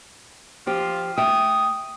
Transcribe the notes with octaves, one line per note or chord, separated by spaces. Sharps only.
F3 F4 G4
A3 E5 G5 D#6